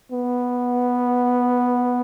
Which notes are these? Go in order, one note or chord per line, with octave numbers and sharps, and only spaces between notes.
B3